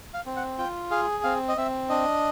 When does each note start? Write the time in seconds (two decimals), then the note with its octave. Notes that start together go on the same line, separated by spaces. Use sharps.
0.14 F5
0.26 C4
0.36 F#5
0.58 F4 G5
0.91 G#4 F5
1.24 C4 F5
1.48 D#5
1.57 C4 E5
1.90 D4 D#5